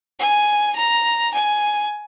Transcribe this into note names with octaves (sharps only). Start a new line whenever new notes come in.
G#5
A#5
G#5